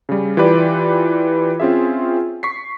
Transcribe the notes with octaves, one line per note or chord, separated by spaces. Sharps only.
C#3 G3
E3 F4 G4 B4 D5
C4 C#4 F4 G#4 E5
C#6 B6 C7